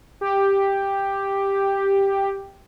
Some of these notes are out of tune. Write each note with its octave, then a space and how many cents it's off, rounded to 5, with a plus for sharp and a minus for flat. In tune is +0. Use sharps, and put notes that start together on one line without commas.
G4 +5